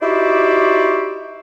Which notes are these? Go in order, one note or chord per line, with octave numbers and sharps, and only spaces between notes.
D#4 E4 F#4 G4 C5 D5